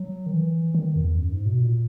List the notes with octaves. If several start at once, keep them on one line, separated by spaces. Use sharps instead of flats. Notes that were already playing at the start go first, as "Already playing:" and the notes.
Already playing: F#3
D#3
E3
D#3
E2
F#2
G#2
B2
A#2